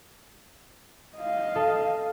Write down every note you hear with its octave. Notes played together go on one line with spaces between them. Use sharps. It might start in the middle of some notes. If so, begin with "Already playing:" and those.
D#5 F5
A4